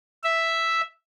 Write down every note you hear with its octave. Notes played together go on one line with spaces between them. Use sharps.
E5